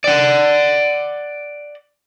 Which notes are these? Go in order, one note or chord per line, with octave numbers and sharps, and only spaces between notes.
D5 F#5